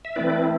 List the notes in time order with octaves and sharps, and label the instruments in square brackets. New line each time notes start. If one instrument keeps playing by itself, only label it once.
[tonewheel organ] E5
E3 A3 C4 E4 B4 D5